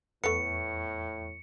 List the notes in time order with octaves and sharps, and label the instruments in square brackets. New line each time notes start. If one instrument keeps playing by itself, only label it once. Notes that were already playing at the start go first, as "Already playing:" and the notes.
[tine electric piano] E2 C#6 [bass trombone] A2 [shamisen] A3 B3 [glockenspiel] C#7